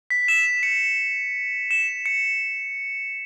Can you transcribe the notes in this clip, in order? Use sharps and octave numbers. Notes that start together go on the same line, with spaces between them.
B6
E7
C#7
E7
C#7